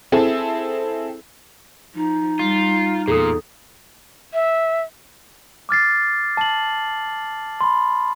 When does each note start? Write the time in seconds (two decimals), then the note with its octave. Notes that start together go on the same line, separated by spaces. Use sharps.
0.12 C4 E4 G#4 A4
1.95 F3 D#4
2.39 G3 F4
3.08 E2 A#2 G#4 A4 D#6
4.34 E5
5.69 D6 F6 A6 C7
6.37 A5 F#7
7.61 B5 C6